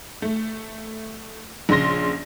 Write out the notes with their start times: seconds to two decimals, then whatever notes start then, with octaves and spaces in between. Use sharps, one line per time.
0.22 A3
1.69 A#1 C#3 C6 A#6